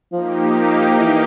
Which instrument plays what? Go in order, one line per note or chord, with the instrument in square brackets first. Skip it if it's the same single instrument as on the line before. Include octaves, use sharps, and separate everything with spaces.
[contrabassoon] F3 [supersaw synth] A#3 D#4 G4
[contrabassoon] E3